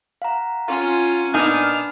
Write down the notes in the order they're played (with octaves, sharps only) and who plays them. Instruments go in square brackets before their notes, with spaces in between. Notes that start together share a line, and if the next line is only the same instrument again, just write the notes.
[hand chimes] F5 F#5 A#5
[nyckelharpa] C#4 G#5 [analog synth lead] F4
[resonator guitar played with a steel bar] A#2 D#4 G#5 [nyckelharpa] B3 D4 [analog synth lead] F6